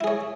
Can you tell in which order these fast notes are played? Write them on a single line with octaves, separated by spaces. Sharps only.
E4 G#4 C#5